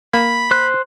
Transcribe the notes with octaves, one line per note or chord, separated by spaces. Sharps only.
A#3 B5
C5 F#6